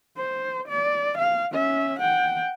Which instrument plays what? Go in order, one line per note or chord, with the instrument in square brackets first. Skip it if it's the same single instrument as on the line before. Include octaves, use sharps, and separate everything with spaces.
[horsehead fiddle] C5
D5
F5
C#4 E5
F#5 G5